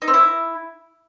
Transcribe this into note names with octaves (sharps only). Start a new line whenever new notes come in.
D#4
C4
E4